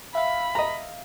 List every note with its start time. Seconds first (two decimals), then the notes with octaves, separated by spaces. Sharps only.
0.15 E5 F5 B5
0.55 D#5 A#5